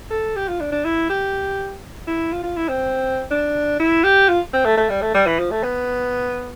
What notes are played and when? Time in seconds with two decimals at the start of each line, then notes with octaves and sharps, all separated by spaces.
0.11 A4
0.36 G4
0.48 F4
0.60 D4
0.72 D4
0.85 E4
1.09 G4
2.07 E4
2.32 F4
2.44 F4
2.57 E4
2.68 C4
3.31 D4
3.79 E4
4.04 G4
4.29 F4
4.53 C4
4.65 A3
4.77 A3
4.89 G3
5.01 A3
5.14 G3
5.26 E3
5.39 F3
5.51 A3
5.63 B3